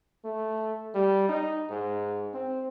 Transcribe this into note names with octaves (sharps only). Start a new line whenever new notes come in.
A3
G3
D#4
G#2
C4